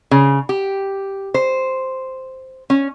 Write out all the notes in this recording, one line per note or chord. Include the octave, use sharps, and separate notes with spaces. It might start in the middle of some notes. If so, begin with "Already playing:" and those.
C#3
G4
C5
C#4